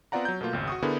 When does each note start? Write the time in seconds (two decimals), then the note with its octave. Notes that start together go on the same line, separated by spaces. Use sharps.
0.12 B3 C4 F4 D5 F#5 A#5
0.25 F#3 G6
0.41 B2 A3 A#3 F4
0.53 G#1 C#2
0.67 F#4 C#6 D#6
0.83 D3 B3 D4 E4 G#4 A#4